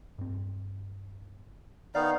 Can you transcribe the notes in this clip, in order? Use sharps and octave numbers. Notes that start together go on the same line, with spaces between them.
G2 C4
D#3 B3 D#4 D5 F5